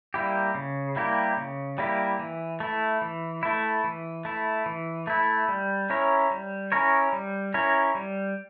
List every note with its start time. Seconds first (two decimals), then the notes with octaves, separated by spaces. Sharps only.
0.14 G3 A#3 E4 G4
0.55 C#3
0.96 G3 A#3 E4 G4
1.37 C#3
1.78 G3 A#3 E4 G4
2.19 E3
2.60 A3 E4
3.02 E3
3.43 A3 E4
3.84 E3
4.25 A3 E4
4.66 E3
5.07 A3 E4
5.48 G3
5.90 C#4 E4 A#4 C#5
6.31 G3
6.72 C#4 E4 A#4 C#5
7.13 G3
7.54 C#4 E4 A#4 C#5
7.95 G3